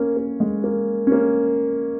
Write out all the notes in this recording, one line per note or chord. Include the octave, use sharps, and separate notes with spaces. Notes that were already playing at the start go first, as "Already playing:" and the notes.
Already playing: A#3 C#4
A#3
G#3
A#3
C#4
A#3